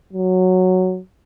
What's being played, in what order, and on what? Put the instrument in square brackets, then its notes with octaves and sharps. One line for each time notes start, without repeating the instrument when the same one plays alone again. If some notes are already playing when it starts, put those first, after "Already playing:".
[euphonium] F#3